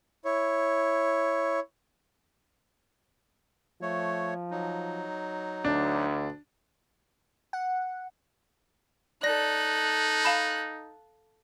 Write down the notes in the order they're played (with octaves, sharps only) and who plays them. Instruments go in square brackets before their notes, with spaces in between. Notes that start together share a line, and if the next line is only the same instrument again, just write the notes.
[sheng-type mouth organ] E4 C#5
[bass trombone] F3 [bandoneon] A3 C#5
[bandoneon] F#3 D#4
[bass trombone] D2 [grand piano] D4
[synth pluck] F#5
[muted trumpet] D#4 [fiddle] A4 F#6 [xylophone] D5 A#6
[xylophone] F5 A5 B5